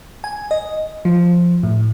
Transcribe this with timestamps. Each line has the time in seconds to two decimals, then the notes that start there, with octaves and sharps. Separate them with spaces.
0.24 G#5
0.51 D#5
1.05 F3
1.63 A2